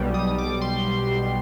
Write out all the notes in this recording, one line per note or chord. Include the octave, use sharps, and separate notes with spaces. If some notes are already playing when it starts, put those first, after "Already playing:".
Already playing: B1 B2 G3
D#6
D6
C6